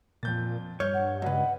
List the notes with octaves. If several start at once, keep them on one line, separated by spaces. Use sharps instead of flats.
F2 A#2 G6 A6
G2 C#5 F6 G6 G#6
F#5
C#2 F#2 B4 D5 D#5 F#5